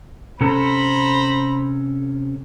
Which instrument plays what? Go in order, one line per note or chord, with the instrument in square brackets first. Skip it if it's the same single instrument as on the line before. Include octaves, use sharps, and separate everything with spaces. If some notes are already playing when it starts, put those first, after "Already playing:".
[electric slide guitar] C3 C#4 A4 [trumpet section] C5 A#5 B5